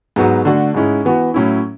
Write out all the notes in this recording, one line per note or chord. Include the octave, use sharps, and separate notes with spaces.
G#2 F#3 B3 F#4
D3 A3 D4 F#4
G#2 G#3 C#4 E4
E3 B3 F#4
A2 F#3 C#4 E4